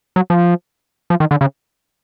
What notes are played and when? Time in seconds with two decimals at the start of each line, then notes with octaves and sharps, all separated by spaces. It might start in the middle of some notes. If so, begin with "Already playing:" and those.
0.16 F#3
0.30 F3
1.10 F3
1.20 D#3
1.31 D3
1.41 C#3